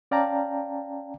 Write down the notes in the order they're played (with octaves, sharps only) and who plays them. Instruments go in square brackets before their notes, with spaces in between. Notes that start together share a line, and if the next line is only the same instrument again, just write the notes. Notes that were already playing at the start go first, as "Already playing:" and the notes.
[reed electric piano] C#4 D5 F5 G5 A5 A#5